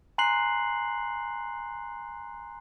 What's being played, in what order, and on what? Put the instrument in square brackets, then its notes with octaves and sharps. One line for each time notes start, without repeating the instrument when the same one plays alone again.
[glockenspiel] G#5 A#5 C6 F#6 C7 F#7